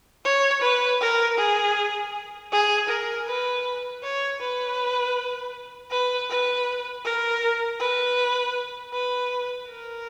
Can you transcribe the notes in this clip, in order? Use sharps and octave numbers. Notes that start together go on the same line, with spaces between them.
C#5
B4
A#4
G#4
G#4
A#4
B4
C#5
B4
B4
B4
A#4
B4
B4
A#4